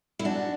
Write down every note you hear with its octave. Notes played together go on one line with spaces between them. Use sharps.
E4
F#2 D4 F#4